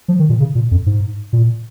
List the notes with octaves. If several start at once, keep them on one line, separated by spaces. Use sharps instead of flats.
F3
D#3
A#2
C#3
A#2
F2
G#2
A#2